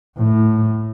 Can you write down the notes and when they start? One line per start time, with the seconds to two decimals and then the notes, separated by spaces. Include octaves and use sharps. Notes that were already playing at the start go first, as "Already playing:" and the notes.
0.17 A2